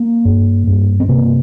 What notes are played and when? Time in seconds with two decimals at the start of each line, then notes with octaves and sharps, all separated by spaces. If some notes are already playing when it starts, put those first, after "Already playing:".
Already playing: A#3
0.25 G2
0.67 G2
1.00 C4
1.09 C3 A#3